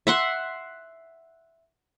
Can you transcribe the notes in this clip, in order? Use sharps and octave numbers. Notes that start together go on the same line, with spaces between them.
E5 F#5 C6